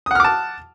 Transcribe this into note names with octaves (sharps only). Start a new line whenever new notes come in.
F#5 A5 D6 D#6 F6